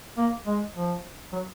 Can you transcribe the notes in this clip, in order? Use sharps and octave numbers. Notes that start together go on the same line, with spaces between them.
A#3
G#3
F3
F#3